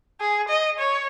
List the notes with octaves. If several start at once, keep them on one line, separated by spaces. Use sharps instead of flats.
G#4
D#5
C#5